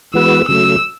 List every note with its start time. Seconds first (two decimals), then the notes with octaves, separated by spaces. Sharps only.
0.14 E3 G#3 B3 F#4 B4 E6
0.48 C#3 F#3 A3 E6